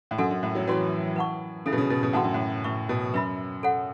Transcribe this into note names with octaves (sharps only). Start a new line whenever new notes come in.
A2
F#2 C#4 F#4 A4 F#5
F#2
A2
F#3
E3 C#4 F#4 C#5
B4 F#5 A5 C#6
C#3 E4 A4 C#5 E5
B2
C#3
B2
B2
A2 F#4 B4 F#5 A5
F#2
A2
A2 B4 E5 C#6
B2
F#2 B4 E5 B5
A4 C#5 F#5